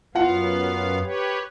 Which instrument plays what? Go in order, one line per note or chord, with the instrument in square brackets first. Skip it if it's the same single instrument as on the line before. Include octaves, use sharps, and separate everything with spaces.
[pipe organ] F#2 B3 F5 [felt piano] F4 F#5
[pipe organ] G4 B4 C#5